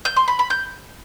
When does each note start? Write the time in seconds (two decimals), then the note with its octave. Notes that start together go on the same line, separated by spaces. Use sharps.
0.05 G6
0.16 C6
0.28 B5
0.39 B5
0.50 G6